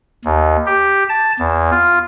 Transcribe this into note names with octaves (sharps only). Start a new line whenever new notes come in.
D#2
G4
A5
E2
F4